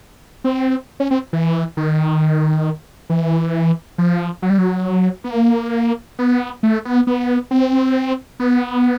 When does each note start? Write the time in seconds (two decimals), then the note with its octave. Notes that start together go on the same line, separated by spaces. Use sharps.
0.44 C4
1.00 C#4
1.11 C4
1.33 E3
1.77 D#3
3.10 E3
3.98 F3
4.42 F#3
4.50 G3
4.58 F#3
5.24 B3
5.31 A#3
6.19 B3
6.63 A3
6.85 B3
7.07 B3
7.51 C4
8.40 B3